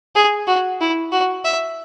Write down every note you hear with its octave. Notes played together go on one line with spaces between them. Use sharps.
G#4
F#4
E4
F#4
E5